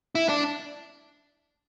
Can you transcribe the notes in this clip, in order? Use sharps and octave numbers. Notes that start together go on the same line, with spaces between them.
E4
D4